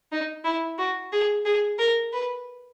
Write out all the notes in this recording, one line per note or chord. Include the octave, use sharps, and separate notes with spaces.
D#4
E4
F#4
G#4
G#4
A#4
B4